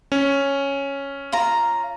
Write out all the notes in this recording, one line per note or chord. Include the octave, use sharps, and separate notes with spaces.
C#4
F4 A#5